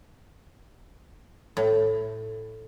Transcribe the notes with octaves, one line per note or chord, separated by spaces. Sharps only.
A2